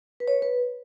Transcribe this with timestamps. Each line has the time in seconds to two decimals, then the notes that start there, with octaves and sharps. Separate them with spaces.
0.20 B4
0.28 C#5
0.42 B4